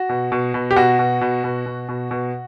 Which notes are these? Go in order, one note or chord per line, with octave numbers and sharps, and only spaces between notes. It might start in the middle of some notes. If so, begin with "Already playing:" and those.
Already playing: F#4
B2
B2
B2
G4
B2 F#4
B2
B2
B2
B2
B2
B2